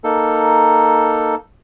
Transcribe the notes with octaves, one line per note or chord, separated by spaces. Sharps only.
A#3 D#4 A4